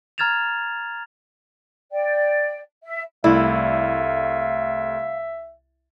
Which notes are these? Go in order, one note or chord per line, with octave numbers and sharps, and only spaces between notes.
A#5 F6 G#6 A6 E7 F7
D5 G5
E5
C2 A3 E4 D5 E5 F5